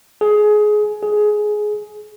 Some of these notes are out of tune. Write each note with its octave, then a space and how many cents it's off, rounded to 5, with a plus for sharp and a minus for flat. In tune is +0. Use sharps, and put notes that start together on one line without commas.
G#4 +20
G#4 +15